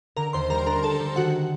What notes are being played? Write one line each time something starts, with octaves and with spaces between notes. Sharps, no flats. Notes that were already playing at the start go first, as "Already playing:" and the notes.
D3 A#4 A#5
D#2 C5 C6
G3 A#4 A#5
D4 A#4 A#5
D4 A4 A5
G3
D#3 F#4 F#5